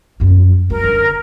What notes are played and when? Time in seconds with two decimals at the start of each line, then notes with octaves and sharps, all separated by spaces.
0.20 F#2 F3
0.70 F#2 A#4
0.84 D3